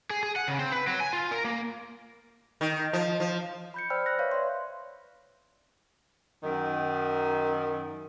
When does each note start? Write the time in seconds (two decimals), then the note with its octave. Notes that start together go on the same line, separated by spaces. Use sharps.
0.10 G#4
0.23 G#4
0.36 F#5
0.48 C#3
0.59 C4
0.72 B4
0.87 F#3
1.00 G#5
1.13 F4
1.31 A#4
1.45 A#3
2.61 D#3
2.93 F3
3.20 F3
3.74 B5 G6 C#7
3.90 C5 D5 G5 B5 E6 F6
4.06 F#6 A#6
4.19 B4 C#5 E5 F5
4.31 D5 C6
6.43 F#2 D#3